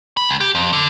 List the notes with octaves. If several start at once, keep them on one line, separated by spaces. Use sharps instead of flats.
B5
C#2
G4
F2
D3